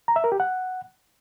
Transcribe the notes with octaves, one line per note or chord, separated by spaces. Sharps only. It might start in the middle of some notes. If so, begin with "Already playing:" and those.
A#5
E5
A#4
G4
F#5